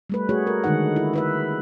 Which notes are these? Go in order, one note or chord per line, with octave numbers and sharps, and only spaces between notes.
G3 A3 B4
A3 F#4 G#4 C#5
A#4
D3 D#3 G#3 D#4 F#5
E4
E4 B4 E5